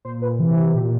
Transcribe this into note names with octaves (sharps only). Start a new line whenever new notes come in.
A#2 C5
B4
C3 E3
A#2 G4